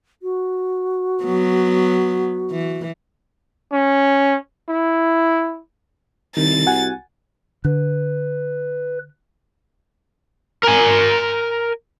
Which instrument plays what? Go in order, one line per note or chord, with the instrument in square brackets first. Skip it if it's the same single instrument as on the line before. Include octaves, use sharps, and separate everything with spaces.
[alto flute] F#4
[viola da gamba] F#3 B3
E3
[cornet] C#4
E4
[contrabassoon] C2 [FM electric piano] D#3 [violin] A6
[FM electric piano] F#4 F#5 G#5
[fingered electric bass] D3 [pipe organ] B4
[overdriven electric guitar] A#4 G#5